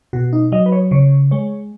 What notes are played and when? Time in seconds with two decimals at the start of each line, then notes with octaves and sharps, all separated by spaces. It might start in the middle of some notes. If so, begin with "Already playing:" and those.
0.13 B2 F#4
0.33 D#4
0.52 F#3 D#5
0.66 B4
0.72 C#5
0.91 C#3 C#5
1.31 G#3 C#5